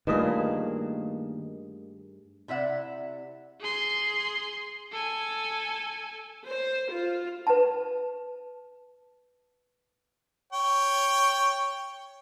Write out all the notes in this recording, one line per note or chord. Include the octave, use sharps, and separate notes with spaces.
G2 D#3 A3 A#3 F4 G#4 A#4 D#5
C3 E4 D5 E5 F#5
G#4 C6
A4 G#5
C5
F4
B4 A5
C#5 G5